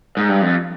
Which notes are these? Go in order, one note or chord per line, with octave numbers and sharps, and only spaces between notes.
G#2
G2
F2